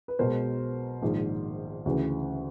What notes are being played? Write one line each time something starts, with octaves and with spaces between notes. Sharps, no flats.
B4
B1 B2 G#3 A#4 C5
A#1 G#2 D#3
D2 C#3 E3